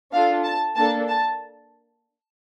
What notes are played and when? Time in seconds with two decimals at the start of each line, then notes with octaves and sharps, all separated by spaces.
0.12 D4 F4 A4 F5
0.45 A5
0.76 A#3 D4 A4 A5
1.08 A5